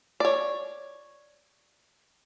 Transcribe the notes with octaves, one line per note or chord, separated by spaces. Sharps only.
C#5 D5